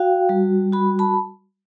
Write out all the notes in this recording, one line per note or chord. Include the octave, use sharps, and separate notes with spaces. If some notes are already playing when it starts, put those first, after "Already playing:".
Already playing: F#4 F5 G5
G3
F#4 B5
A5 B5